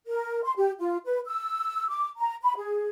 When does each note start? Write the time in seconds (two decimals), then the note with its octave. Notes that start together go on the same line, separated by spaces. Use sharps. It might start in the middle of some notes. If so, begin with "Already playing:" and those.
0.06 A#4
0.43 C6
0.57 G4
0.79 F4
1.05 B4
1.26 E6
1.89 D6
2.18 A#5
2.42 B5
2.57 G#4